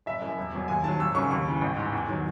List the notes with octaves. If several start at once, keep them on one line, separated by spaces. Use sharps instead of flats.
F#1 E5
F#2 E3
E1
E2 B2 F#3
D#2 G#5
D#3 F#3 A5
G#1 E6
F#2 C#3 F#3 C#6
D#2 C#6
C#3 E3
A1
G#2 E3
E2
D#3 F#3